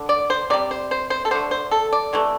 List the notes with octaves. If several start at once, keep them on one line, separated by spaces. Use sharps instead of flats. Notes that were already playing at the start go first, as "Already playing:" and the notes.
Already playing: D3
D5
C5
C3 G3 D5
C5
C5
C5
A4
D3 A3 C5
C5
A4
D5
C3 E3 A3